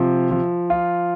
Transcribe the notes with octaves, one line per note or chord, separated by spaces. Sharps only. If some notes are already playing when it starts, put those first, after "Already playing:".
Already playing: C3 F3
F3
F4